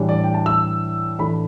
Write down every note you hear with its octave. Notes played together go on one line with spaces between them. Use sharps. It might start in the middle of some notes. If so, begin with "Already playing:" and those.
Already playing: A2 E3 G3 D4
D5
G5
A5
E6
A2 E3 A3 D4 B5